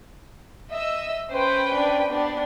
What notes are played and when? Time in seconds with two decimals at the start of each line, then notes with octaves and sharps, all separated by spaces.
0.72 D#5 E5 E6
1.31 C#4 B4 C5 G5
1.76 D4
2.10 B3 D4 G4